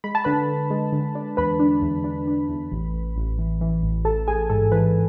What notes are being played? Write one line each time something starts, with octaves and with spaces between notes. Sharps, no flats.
G#3 B5
A5
D3 B4 B5
D3
G#3
D3
D4
E2 B4 B5
D4
E2
D4
D4
E2
A1
A1
A1
E3
E3
A1
A1 A4 A5
A1 G#4 G#5
G#2 A4
E3 B4